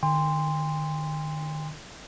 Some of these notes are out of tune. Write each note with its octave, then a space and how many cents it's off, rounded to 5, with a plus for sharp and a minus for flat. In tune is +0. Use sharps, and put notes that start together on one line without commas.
D#3 -35 G5 +40 C6 -10